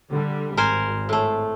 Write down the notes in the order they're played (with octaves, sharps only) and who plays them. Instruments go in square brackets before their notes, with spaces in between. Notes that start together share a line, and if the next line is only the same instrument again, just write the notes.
[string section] D3 G3
[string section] G#1 [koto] A#4 C5 G#5
[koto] A2 A3